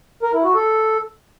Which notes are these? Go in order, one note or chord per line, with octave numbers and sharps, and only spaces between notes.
A#4
E4
F#4
A4